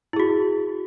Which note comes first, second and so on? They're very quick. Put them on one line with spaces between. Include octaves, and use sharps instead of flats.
E4 G#4 F#4